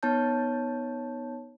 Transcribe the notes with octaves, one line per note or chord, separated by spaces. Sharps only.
B3 D#4 C#5 A5 G6